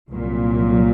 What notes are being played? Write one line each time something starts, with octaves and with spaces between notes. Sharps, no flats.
C2 A#2 F#3